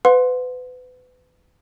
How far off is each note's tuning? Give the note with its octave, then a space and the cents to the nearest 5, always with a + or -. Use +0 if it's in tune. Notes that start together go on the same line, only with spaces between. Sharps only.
B4 +30 F#5 -45 C6 +0